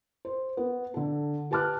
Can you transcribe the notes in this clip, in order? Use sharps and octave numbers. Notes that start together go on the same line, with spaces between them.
C5
B3
D3 A4
G4 B4 A5 D6 F6 F#6